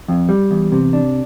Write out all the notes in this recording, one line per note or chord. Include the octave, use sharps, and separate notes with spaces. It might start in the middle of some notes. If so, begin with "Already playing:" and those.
F2
G3
E2
C3
D4